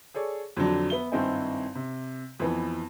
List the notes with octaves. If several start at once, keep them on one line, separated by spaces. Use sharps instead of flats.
G#4 A4 C#5 D5
F2 D3 F#3 D4
B3 E5 G7
G#1 G2 C4 D#4 E4 G#5
C3
F2 E3 B3